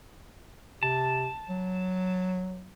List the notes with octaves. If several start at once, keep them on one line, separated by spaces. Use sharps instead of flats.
C3 A5
F#3